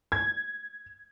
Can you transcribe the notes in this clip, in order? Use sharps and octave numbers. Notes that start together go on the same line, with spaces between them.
G#6